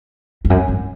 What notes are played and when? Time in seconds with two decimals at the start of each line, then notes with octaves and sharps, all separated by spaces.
0.45 F2
0.50 F#2
0.68 G2